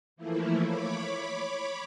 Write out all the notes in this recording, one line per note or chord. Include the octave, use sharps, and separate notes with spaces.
E3 F3 A3 A#3 E4
C#5 B5 D6